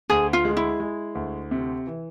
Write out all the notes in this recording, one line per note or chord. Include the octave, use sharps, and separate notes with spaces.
D2 G#4
F4
G#3
E4
G#3
D2
C3
E3